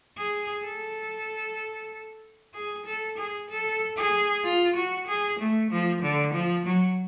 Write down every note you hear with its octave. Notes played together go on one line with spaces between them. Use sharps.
G#4
A4
G#4
A4
G#4
A4
G#4
F4
F#4
G#4
A3
F3
D3
F3
F#3